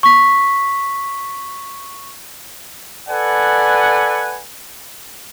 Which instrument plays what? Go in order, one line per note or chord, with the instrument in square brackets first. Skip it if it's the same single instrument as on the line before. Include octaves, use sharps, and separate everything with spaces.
[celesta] C#6 B6
[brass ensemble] A4 B4 D5 F#5 G#5